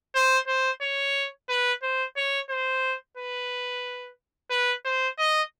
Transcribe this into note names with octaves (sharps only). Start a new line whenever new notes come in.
C5
C5
C#5
B4
C5
C#5
C5
B4
B4
C5
D#5